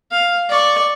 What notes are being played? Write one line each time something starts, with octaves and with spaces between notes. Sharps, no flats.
F5
D5 C#6